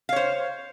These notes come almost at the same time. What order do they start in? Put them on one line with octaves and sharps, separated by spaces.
F5 C#5 C5